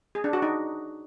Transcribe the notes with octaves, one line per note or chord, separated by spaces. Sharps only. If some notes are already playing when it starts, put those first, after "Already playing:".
G#4
D4
F#4
D#4